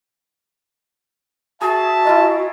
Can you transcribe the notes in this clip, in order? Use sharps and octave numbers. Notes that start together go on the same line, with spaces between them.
F#4 G#4 E5 A5
E4 F4 D#5 A#5